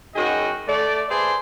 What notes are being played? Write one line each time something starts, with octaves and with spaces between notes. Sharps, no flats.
F#2 D#4 F#4 G#4 D#5 G5
A3 D5
G#4 B4 C5 D5 E5 A5